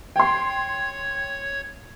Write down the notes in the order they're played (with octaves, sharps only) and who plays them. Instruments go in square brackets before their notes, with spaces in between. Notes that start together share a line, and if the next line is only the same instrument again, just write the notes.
[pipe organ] C#5 G#6 [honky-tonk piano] G5 C6